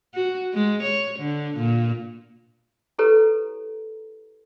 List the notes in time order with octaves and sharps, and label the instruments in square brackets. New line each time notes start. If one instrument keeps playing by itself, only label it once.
[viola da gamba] F#4
G#3
C#5
D3
A#2
[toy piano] E4 G4 A4 B4 C#5 A#5